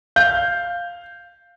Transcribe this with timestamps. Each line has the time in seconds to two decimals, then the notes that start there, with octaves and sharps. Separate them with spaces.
0.16 F5 G6